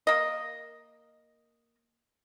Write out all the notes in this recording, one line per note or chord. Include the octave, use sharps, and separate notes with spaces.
A#3 D#5